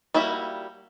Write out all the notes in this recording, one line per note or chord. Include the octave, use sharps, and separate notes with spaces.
G3 A#3 E4 F#4 E5